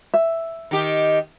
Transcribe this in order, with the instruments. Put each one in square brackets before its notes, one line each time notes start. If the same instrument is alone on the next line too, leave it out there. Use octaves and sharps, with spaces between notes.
[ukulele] E5
[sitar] D#3 G4